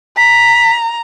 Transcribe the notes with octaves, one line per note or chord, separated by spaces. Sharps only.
A#5 B6